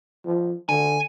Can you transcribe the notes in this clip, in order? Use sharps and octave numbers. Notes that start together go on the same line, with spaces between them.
F3
D3 G#5